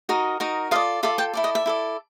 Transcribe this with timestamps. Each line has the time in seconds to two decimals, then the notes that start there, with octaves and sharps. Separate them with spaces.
0.09 D#4 F#4 A#4 D#5
0.40 D#4 F#4 A#4 D#5
0.71 F4 A4 D5 D#5 F5
1.03 F4 A4 D5 E5
1.18 G5 A5
1.33 E4 A4 D5
1.44 D#5
1.55 E5
1.66 E4 A4 D5